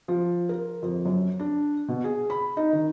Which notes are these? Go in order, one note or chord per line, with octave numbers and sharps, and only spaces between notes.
F3
A#4
F2
F#2
D4
B2
G#4
B5
D#4
D#3